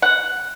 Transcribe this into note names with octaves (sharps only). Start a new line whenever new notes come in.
F#5